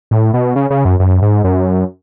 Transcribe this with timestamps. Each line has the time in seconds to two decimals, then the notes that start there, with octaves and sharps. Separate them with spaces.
0.11 A2
0.34 B2
0.56 C#3
0.70 C#3
0.85 F#2
1.00 F#2
1.22 G#2
1.44 F#2